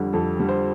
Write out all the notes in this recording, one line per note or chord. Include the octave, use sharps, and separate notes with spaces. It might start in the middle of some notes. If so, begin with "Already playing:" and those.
Already playing: F2 D3 G3
F2 A4
D3 G3
C5